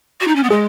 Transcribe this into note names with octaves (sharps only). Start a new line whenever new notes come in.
F#4
D#4
C#4
B3
G#3 G#4